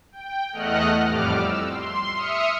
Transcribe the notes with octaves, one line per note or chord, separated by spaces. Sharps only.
G5
E2 A3 D#5 F#5 F6 F#6
F2 A2 G3 D6 F6
E6
C6
E5 D#6 F6 C#7